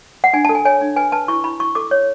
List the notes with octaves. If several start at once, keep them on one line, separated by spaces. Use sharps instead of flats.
F#5
D4 G#5
A5
A4
G#5
C#5 G#5
D4
B4 G#5
B4 A5
E4 C#6
E4 B5
E4 C#6
A4 D6
C#5